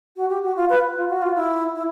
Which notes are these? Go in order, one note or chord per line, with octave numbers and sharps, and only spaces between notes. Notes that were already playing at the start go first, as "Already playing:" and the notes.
F#4
G4
F#4
F4
B4
F4
F#4
F4
E4
E4